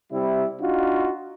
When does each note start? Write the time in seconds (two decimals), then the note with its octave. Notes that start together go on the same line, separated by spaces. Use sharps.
0.13 C3 G3 E4
0.60 D4 D#4 F4 F#4